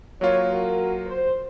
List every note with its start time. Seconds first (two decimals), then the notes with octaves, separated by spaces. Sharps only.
0.21 F#3 A#3 F4 C#5
0.50 F#4 A#4
1.06 C5